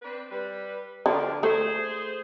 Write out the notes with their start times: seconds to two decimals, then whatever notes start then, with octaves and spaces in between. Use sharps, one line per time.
0.02 C4 D4 B4
0.31 G3 B4
1.06 D3 F3 D4
1.43 A3 G#4 C5